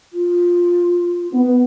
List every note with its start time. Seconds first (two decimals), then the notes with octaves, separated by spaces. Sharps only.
0.13 F4
1.33 B3